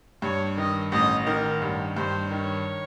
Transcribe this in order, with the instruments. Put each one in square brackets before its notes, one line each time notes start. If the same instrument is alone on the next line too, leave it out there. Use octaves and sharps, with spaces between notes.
[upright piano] G2 [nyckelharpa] C#5
[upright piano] D#3 [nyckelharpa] D#5
[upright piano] A1 [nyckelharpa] D#5
[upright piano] D#3 [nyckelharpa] A#4
[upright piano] G2
[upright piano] G2 [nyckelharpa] C5
[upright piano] D#3 [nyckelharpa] C#5